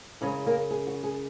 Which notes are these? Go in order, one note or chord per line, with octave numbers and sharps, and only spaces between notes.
F#2 C#3 G#3 C#4 C#5
A#3 A#4
G#4
F#4
G#4